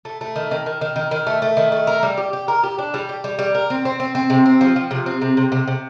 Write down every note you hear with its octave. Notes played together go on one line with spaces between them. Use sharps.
A3
A3
D#3
D#3
D#3
D#3
D#3
D#3
A3
A3
D#3
A3
A#4
G3
G4
G4
A#4
G4
D4
G3
G4
G3
G3
A#4
C4
C4
C4
C4
C3
C4
F3
F3
C3
C4
C3
C3
C3
C3